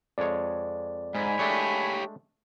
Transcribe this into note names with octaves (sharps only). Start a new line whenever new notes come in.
F2 G#3 C#5 D5
G#2 G#5 B5
G#3 A3 D4 G4 C#5